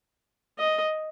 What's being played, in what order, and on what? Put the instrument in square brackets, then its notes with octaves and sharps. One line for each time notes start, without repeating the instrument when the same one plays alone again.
[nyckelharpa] D#5